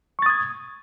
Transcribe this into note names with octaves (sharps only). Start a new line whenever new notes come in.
C#6 D#6 G#6 A6